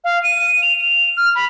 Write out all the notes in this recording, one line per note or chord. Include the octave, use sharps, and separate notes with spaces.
F5
D#7
F7
F7
F6
B5